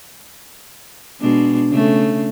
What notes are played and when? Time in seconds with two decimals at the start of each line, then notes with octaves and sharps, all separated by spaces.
1.20 B2 G#3 D4
1.70 C#3 A3